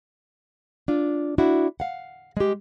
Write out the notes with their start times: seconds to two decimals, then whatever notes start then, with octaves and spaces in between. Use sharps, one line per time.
0.88 D4 F4
1.38 D4 E4 F#4
1.80 F5 F#5
2.37 G#3 G4